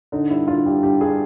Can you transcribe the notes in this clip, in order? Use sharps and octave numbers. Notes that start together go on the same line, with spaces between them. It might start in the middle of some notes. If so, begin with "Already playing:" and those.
D3 D#4
G2 E4
D3 F4
G2 G4
G2 G4
G2 G#4